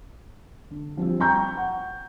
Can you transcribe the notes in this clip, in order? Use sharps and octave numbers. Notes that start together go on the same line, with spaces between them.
D3
F3 G3 C4
G5 A#5 C#6 G6
F#5